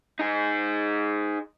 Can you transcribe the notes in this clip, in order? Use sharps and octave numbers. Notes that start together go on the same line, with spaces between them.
D#4 G#4